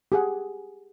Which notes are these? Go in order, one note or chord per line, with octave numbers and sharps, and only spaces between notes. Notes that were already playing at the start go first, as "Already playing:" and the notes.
G4 G#4 F#5